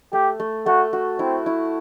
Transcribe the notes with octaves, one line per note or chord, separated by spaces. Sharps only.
A3 G4
A3
A3 F#4
F#4
C4 E4
E4